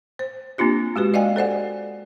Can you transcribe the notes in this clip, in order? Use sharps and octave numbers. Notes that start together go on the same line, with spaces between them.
C5
A#3 C4 D4 F4 G4
G#3 F#4 G4 B4
D5 D#5 F5 G5 G#5
A4 C5 D5 F#5